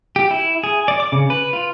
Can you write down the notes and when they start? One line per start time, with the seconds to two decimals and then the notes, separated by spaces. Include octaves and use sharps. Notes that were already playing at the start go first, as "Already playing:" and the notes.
0.16 G4
0.31 E4
0.64 G#4
0.88 D5
1.00 D6
1.12 C#3
1.30 B4
1.53 F4